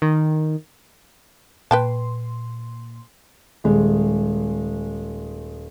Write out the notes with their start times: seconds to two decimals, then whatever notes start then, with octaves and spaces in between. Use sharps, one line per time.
0.02 D#3
1.71 A#2 B4 G5 A5 C6
3.64 D#1 G#3